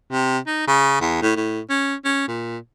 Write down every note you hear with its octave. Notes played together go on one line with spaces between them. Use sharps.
C3
D#4
C#3
E2
A2
A2
C#4
C#4
A#2